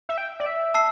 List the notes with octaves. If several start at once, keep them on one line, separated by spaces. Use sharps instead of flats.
E5
G5
D5
E5
A5 E6 C7